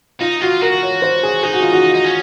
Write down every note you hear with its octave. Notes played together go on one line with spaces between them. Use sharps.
D#4 F4
F4 F#4
F#4 A#4
C#5
C5
G#4
D#4 G#4
F#4
F4
F#4
D#4
C#4